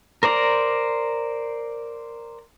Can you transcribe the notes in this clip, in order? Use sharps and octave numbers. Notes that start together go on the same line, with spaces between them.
A#4 C5 D5 A#5